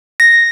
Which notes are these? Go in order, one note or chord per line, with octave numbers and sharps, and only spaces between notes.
A#6